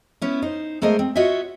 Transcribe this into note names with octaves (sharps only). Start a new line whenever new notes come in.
B3 C#4 E4
D#4 C5
G#3 A3 B3 A#4 C5 D#5
C4
F4 F#4 C#5 D#5 E5